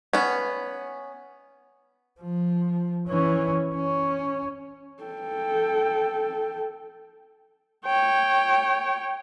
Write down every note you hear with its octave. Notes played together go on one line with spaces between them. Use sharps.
B3 C#4
F3
E3 C#4
C#4
A4 G5
C#5 G5